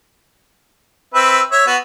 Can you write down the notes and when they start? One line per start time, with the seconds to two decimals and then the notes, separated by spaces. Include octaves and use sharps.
1.14 C4 B4 E5
1.52 C#5 E5
1.67 B3 F#4